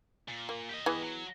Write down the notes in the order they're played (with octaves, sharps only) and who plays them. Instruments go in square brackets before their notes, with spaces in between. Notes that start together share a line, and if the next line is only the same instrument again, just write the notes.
[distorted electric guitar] A#2
[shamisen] A#3
[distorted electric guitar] G4 D#5
[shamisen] E3 B3 G#4
[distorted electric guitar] F#3